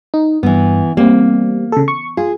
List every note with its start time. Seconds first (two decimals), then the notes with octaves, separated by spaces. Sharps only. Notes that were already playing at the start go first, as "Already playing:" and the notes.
0.14 D#4
0.43 G2 E3 B3
0.97 G3 A#3 C4
1.72 C#3 A4
1.88 C#6
2.17 F4 G#4